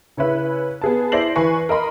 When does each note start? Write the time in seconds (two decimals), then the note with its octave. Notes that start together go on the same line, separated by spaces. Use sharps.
0.17 C#3 C#4 E4 B4
0.82 B3 G#4 A5
1.12 E4 C5 D5 A#6 C7 F#7
1.36 E3 B4 G#5 C#6
1.69 A#4 D#5 B5 C6